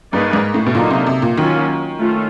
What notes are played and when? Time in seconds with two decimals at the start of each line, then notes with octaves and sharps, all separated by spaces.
0.13 G2 A#3 D#4 G#4 B4 D5
0.33 G#2
0.54 A2
0.66 B2
0.75 A#2 D3 F#3 A#3 D#4
0.90 C3
1.07 C3
1.22 A#2
1.37 D#3 F#3 A#3 C#4 F4
1.99 A3 C#4 F4